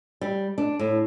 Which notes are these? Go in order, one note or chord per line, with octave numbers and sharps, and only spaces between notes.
G3
D4
A2